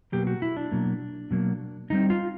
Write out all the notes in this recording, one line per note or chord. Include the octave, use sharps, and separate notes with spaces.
B2 F#3 A#3 G4
F#4
E4
D4
B2 F#3 A#3
B2 F#3 A#3
D3 G3 C4 D#4
F4